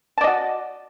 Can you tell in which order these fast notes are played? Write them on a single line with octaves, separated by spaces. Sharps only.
A5 D5 D#5 F#4